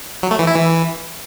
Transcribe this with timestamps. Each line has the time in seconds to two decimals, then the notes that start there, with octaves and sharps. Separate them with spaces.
0.23 F#3
0.31 A3
0.39 E3
0.47 E4
0.55 E3